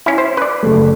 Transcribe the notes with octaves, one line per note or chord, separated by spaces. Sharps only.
C#4 E4
C5
B4 D5
F#1 A3